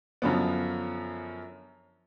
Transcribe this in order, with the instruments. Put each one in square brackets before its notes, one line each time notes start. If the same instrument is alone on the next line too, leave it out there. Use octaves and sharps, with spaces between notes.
[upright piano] F#2 D3 F3 B3